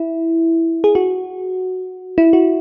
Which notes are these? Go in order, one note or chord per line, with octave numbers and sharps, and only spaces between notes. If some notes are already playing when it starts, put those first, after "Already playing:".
Already playing: E4
G#4
F#4
E4
F#4